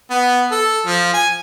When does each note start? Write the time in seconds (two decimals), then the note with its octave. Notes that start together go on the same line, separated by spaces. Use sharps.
0.10 B3
0.52 A4
0.86 F3
1.13 G#5